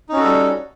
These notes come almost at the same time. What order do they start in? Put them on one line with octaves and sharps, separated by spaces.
D#4 C#4 F#4 A4 G3